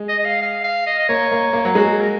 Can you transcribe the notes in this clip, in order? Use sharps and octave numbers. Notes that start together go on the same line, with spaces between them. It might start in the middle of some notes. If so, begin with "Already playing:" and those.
Already playing: G#3
D#5
D#5
F5
F5
F5
D#5
D#5
A#3 C#5
A#3
A#3
F#3
G#3 F#4
A#4